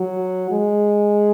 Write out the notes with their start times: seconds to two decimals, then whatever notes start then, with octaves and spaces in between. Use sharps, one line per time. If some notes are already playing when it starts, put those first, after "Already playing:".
Already playing: F#3
0.51 G#3